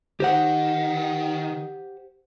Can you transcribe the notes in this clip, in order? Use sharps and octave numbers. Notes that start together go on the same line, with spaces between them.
D#3 G4 C5 F#5